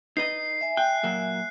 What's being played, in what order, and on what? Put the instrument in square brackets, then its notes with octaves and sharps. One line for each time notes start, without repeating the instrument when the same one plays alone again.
[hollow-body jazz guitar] D#4 B4 D#5 [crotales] C7
[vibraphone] E5 G#5
[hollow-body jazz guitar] G5 [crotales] F#6
[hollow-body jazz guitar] A#2 F#3 A#3